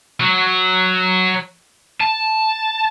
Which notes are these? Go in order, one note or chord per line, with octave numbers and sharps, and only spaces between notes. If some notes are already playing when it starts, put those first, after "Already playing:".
F#3
A5